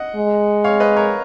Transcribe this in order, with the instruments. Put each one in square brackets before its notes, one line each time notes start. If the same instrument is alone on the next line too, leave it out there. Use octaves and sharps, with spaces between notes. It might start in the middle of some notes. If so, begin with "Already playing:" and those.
Already playing: [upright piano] D#5 F#5
[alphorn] G#3
[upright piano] C#5 F5
B4 D#5
A#4 C#5